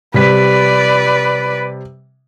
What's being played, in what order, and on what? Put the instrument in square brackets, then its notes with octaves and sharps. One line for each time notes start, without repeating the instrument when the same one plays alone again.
[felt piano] C3 G3 B6 [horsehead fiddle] B4 D5